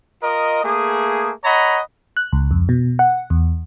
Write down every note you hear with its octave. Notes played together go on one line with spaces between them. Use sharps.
F4 A#4 D#5
A3 A#3 G#4
C#5 D#5 F#5 A#5 B5
F#6
C#2
F2
B2
F#5
E2